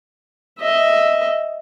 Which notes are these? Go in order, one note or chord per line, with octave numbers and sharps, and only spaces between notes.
D#5 E5